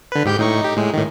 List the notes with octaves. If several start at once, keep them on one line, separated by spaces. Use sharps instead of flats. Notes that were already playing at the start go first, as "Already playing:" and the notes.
D3 B4
G#2 G4 G6
A2 D#4 C#6
D#4 G4
A2 G#3
A2 D#3